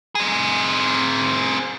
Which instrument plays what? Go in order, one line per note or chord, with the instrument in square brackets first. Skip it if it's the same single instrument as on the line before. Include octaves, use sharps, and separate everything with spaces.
[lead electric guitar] C4 G#4